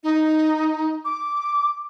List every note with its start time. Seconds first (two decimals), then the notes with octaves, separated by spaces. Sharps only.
0.04 D#4
1.05 D6